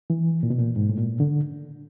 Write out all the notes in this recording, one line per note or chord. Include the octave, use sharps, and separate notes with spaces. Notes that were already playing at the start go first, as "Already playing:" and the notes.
E3
A#2
B2
A#2
G#2
A2
A#2
D3